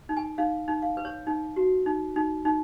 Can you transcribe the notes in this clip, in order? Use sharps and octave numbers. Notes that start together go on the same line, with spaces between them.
D#4
G#5
D#4 F5
D#4
F5
B4
C#5
D#4
F#4
D#4
D#4
D#4